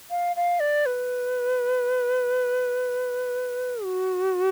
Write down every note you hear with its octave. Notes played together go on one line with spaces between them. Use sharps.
F5
F5
D5
B4
F#4